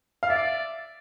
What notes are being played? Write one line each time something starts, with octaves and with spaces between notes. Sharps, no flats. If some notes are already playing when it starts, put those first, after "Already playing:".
F5
D5 E5